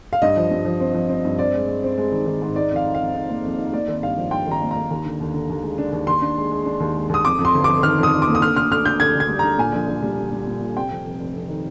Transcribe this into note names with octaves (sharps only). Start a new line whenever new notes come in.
F5
G2 D#5
F3
G2
F3
C4
F3
C4
G2
C4 D5
G#3
G#3
C4
G#3
D#3
D#3
G#2
D#4 D5
F2 F5
D#4
F5
F2
D#4
A#3
F2
D#4
A#3 D5
G#1
G2 F5
F3
G2 G5
G#1 A#5
A#3
A#5
A#3
D#2
D3
D#2
D3
D#2
G#3
D4
D#2
D#2 C6
D4
G#3
G#3
D4
D#2
G#3
D#2 D#6
F2 D6
F2
C6
G1
F2 D6
D#3 F6
F2
D#6
F2
D6
A#3
D#6
D3 F6
D2 F6
D2 F6
D2 G6
D2 G#6
D2
G#6
G3
D3 A#5
A#2 G#5
A#1
A#1
G3
G3
G3
A#2
A#2
C3 G5
F2
F1
F1
F2
D#3